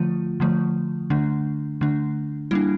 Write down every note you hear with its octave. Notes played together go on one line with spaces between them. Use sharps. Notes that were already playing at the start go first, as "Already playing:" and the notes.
Already playing: D3 F3 A3 F4
D3 F3 A3
D3 A3 D4
D3 A3 D4
G3 A#3 D4 E4